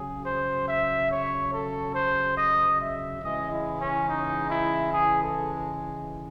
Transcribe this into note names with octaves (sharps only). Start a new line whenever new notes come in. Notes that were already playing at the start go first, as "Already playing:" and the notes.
Already playing: C#3 F#3 G#4
C5
E5
C#5
A4
C5
D#5
E5
C#3 E3 G#3 D#5
E4
C#4
D#4
E4
G#4
A4